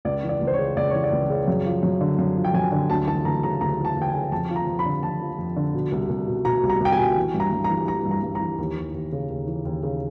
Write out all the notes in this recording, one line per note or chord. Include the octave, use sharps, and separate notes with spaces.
C#2 D5
E3
D5
C#2
C5
C#5
C#3
C#2 D5
E3 C#5
D5
C#2
C#3
F#2
F3
F#2
D3
F#2
F3
G5
F#2 G#5
D3
D2 A5
E3 A5
D2 A#5
C#3 A#5
D2 A#5
E3
A5
D2
G5
G#5
C#3
F2 A5
F3
A#5
F2
B5
D3
F2 A5
F3
F2
D3
B2
C2
C2
B2
B2 A#5
C2
A#5
C2 G5
G#5
B2
E3
G2
A#5
G2
A#5
E3
E3 A#5
G2
A#5
G2
A#5
E3
D#2
E3
D#2
C#3
D#2
E3
D#2
C#3